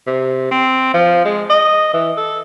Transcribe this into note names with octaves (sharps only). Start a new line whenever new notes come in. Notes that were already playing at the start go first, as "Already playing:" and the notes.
C3
C4
F3
G#3
D#5
E3
A4